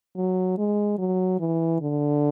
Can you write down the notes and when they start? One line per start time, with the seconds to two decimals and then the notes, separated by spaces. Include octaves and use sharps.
0.16 F#3
0.58 G#3
0.98 F#3
1.40 E3
1.81 D3